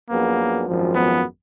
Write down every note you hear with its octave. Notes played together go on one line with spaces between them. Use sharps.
F#2 F3 A#3 B3 D4 G#4
G#1 F#2 F3
B3